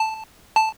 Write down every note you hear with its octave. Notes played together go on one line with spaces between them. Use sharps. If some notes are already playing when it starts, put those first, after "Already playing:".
Already playing: A5
A5